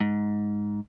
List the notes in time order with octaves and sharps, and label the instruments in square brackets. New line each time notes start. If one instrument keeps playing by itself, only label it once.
[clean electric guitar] G#2